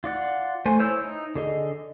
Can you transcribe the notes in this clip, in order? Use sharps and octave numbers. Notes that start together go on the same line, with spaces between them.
F4 D5 F#5
A3 C5 G#5
E4 C5 C#5 E6 G6
D#4
D3 G#4 D#5